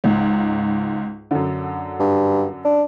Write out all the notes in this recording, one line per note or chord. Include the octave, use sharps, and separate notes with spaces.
C#2 G#2
F#2 D3
G2
D4